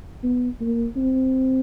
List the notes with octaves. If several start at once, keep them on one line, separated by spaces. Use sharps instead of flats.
B3
A#3
C4